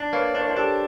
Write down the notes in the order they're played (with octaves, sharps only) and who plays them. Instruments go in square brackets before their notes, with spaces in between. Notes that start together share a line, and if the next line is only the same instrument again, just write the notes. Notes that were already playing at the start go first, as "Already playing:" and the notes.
Already playing: [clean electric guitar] D4
[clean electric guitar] A#3 [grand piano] B4 C#5
[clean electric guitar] D4 [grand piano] C5
[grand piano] C#5
A#4 C5
[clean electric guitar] D4 [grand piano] G4 A4